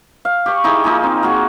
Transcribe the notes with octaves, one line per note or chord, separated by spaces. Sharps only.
F5
G4 C#6
D#4 E4 G4 G#4
F3 A#3 D#4 G#4
C4
A#3 F#4 G#4